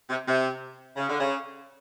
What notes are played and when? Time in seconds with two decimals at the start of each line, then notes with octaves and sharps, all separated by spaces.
0.10 C3
0.27 C3
0.96 C#3
1.08 D3
1.20 C#3